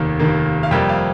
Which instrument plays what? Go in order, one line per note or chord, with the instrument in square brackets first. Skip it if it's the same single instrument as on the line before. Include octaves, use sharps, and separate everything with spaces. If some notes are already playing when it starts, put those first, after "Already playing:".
Already playing: [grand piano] F1 D#2 D#3 A#3
F1 D#2 D#3 A#3
F5
F2 C3 G3 A#3 G5
F5